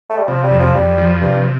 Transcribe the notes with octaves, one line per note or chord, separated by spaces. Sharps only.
A3
G3
C3 F3
G3
F2
F3
F2 G3
F3
G2 C3